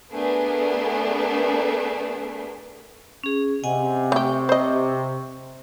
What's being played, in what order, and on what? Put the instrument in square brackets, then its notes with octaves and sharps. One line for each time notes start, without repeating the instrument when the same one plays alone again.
[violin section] A3 B3 D4 G#4 A#4 B4
[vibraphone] C#4 G#4
[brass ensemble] C3 [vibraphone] D#5 F#5 G#5
[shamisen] A3 G4 [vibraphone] C#6
[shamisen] C5 D#5